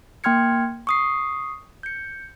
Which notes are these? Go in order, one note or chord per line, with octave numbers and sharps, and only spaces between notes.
A#3 G5 C6 F6 G#6 C#7
C#6 D#6 C7
G6 C#7